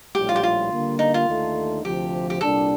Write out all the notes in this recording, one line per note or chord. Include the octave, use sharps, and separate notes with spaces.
A#1 A2 G3 G4
F4
G4
F4
D3 G3 A#3
D#4
F4
D#2 D3 A3 D#4 A4
D2 C3 F3 G4
G4
C2 A#2 G3 D4 A4